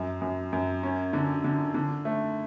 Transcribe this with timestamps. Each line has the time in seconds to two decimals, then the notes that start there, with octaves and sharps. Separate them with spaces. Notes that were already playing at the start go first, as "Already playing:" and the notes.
Already playing: F#2
0.22 F#2
0.53 F#2
0.83 C#4
1.13 D3
1.44 D3
1.74 D3
2.05 A3